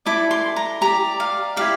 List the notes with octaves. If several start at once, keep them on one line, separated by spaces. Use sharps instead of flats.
E4 A4 D5 D6
C6
A#5
G4 D5 A#5
F5
E4 G4 D5 F5